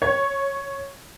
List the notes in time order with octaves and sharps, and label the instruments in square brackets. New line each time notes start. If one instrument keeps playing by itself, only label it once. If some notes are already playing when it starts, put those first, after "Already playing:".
[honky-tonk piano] C#5